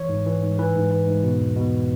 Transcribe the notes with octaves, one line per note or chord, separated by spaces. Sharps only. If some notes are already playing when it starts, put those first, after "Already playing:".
Already playing: E3 C#5
G#2
E3
G#2
E3 B4
G#2
E3
G#2
B2
E2
B2